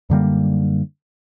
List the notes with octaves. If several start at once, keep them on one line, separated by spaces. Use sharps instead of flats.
F#2 D3 G3 A#3